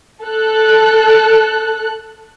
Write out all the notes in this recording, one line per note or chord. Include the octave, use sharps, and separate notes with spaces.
A4 F#6